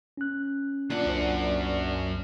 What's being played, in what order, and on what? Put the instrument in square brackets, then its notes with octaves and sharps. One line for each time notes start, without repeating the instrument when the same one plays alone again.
[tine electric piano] C#4 F#6
[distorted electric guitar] F#2 F#5 [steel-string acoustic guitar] A#2 D4
[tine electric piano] C2 C5